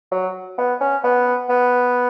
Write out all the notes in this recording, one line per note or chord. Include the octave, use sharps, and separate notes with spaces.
F#3
B3
C#4
B3
B3